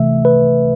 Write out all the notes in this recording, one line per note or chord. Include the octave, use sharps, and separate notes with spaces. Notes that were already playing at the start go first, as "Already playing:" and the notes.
Already playing: C3 E3 A3 E5
B4